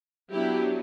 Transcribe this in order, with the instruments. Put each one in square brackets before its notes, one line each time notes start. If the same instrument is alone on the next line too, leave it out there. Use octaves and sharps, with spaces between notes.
[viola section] F#3 B3 D4 E4 G4